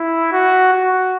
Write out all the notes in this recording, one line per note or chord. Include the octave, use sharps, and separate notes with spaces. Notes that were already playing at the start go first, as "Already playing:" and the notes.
Already playing: E4
F#4
F#4